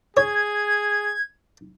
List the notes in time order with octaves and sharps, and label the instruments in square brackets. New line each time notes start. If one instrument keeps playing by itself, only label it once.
[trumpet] G#4 [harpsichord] C#5 [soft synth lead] G#6